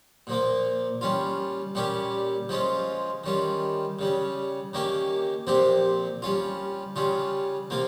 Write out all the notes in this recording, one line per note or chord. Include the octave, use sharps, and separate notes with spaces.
A#2 F3 A#3
G3 C#4 F4
A#2 G3 C#4 G4
F3 G#3 C#4 F4
D#3 G3 C#4 F4
C#3 G3 C#4
D#3 A#3 C#4 G4
A#2 F3 C4 G4
G3 C#4 F4
C#3 G3 C#4 F4
C3 F3 A#3 F4